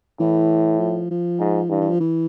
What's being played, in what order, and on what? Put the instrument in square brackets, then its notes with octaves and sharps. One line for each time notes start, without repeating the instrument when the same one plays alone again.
[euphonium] A2 [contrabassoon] E3
[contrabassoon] F3
F3
[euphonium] G#2
[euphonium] G2 [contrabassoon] E3
[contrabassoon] E3
F3
E3